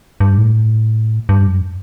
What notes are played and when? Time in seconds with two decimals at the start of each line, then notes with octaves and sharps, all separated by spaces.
0.20 G2
0.38 A2
1.29 G2
1.47 F#2